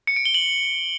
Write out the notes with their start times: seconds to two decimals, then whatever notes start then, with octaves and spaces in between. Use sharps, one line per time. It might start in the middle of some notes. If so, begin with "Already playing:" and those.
0.07 C#7
0.16 D7
0.25 G7
0.34 F#7